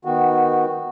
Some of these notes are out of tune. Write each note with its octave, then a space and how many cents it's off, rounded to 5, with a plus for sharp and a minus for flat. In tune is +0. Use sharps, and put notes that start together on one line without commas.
D#3 +0 B3 +0 F#4 -10